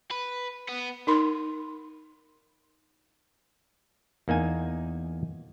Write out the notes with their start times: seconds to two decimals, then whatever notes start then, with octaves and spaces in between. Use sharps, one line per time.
0.11 B4
0.69 B3
1.07 D#4 A#4 B5 C6
4.28 E2 A#3 D#4 G#5